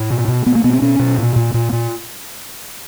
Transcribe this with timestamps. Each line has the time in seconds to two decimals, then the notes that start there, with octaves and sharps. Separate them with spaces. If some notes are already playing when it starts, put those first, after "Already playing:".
Already playing: A2
0.10 B2
0.28 B2
0.46 B2 B3
0.55 A#3
0.64 B2 B3
0.73 C4
0.82 B2 C#4
0.99 B2
1.18 A#2
1.36 A#2
1.54 A#2
1.72 A#2